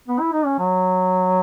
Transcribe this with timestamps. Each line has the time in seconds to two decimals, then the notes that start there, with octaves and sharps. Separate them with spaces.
0.08 B3
0.20 E4
0.33 D#4
0.45 C#4
0.59 F#3